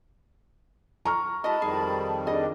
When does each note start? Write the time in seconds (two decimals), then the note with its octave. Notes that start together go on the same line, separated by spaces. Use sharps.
1.05 A#5 C#6 F6
1.44 G#3 E4 F#4 D#5 A5 B5
1.62 F2 D#3 G3 G#4
2.27 D4 G#4 D#5